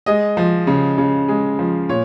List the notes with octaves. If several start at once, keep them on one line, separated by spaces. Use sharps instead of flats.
G#3 D#5
F3
C#3
C#3
G#3
F3
A#2 C#5